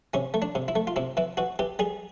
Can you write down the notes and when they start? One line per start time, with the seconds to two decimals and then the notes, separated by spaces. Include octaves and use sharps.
0.14 C3 C#4
0.34 A3
0.42 D4
0.55 C3
0.68 E4
0.76 A3
0.87 F4
0.96 C3 E4
1.17 E3 E4
1.37 E3 F#4
1.59 E3 G4
1.79 G3 G#4